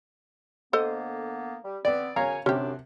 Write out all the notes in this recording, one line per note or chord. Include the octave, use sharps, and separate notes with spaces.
D3 A#3 B3 A4 C5 D#5
G3
B3 C4 D5
F#2 C#3 C#5 F5 G#5 A#5
C2 F#2 C3 C#4 D4 G4